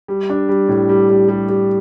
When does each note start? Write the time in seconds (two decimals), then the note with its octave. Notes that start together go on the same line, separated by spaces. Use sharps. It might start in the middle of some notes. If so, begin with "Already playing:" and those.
0.08 G3
0.30 D4
0.49 G3
0.68 A2
0.89 G3
1.09 G3
1.28 G3
1.49 G3